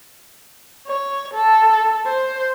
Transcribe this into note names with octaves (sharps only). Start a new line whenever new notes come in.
C#5
A4
C5